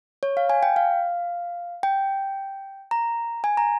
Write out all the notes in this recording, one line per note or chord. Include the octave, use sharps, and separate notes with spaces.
C#5
F5
G#5
G5
F5
G5
A#5
G#5
A#5